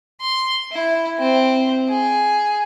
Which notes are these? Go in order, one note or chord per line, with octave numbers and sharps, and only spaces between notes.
C6
E4
C4
G#4